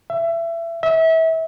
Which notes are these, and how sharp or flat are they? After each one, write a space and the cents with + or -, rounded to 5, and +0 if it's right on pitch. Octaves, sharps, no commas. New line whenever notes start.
E5 +25
E5 -30